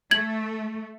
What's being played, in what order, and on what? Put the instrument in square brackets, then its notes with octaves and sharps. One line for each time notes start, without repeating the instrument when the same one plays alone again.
[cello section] A3 [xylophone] G#6 F#7